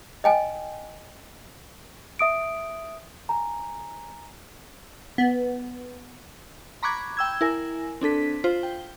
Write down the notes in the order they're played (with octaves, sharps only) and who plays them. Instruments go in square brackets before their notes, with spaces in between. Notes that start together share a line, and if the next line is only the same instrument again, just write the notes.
[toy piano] D#5 G5 G#5
[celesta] E5 D#6 D7
G#5 A#5
[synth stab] B3
[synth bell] A#5 B5 C#6 D6 F#6 G#6
G5 E6 G#6
E4 A#4 G#5
C4 D4 A4 B6
F4 C5
G5